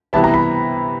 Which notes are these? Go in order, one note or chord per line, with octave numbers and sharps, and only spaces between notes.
C3 E3 G3 B3 E4 A5
A#5
B5